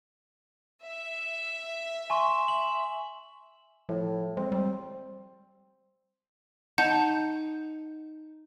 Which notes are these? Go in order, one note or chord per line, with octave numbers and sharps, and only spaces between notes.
E5
G#5 C6 C#6
F#7
A2 F3
G#3 C4
G3
D#4 F#5 A5 G6